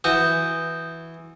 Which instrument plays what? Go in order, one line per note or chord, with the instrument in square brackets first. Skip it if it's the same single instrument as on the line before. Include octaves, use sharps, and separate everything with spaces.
[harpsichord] E3 F#4 [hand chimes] D#6 G6